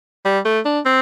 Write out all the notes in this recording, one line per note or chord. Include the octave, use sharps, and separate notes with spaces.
G3
A3
D4
C4